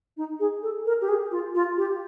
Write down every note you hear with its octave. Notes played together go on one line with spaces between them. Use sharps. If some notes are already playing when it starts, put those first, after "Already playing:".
D#4
G#4
A4
A#4
G4
G#4
F4
F4
G4